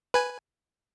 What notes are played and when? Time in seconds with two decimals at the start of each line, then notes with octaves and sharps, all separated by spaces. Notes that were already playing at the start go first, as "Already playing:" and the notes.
0.14 B4 G#5